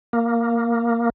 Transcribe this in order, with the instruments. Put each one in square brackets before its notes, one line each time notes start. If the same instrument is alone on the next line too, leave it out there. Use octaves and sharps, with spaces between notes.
[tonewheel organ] A#3